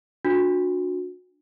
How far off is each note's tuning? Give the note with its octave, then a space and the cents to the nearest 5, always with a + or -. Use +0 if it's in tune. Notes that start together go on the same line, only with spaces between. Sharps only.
D4 +0 F#4 -30